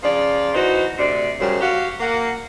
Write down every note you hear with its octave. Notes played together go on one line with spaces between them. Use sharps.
C#3 F3 D5
E3 D#4 F#4 C5
D2 C3 D5
F#2 C#3 G3 C5
F#4 G4 F5
A#3 F#5